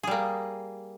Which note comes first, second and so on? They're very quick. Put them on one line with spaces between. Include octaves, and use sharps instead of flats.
G#4 G3 A#3